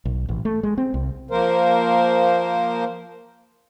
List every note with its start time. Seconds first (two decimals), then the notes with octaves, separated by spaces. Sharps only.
0.05 B1
0.29 A1
0.45 A3
0.63 G#3
0.78 C4
0.94 C2
1.31 F3 A#3 A#4 C5